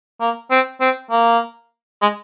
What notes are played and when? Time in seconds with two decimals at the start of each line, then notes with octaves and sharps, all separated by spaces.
0.21 A#3
0.51 C4
0.81 C4
1.11 A#3
2.02 G#3